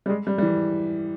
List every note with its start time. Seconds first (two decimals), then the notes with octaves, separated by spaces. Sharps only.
0.06 G3
0.09 G#3
0.27 G3
0.38 G3
0.43 E3